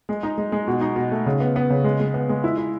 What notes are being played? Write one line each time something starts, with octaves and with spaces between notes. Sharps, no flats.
G#3
D#4
G#3
G#3
B2
D#4
B2
A3
C#3
B3
B3
C#3
G#3
G#3
B3
G#3
E4
E4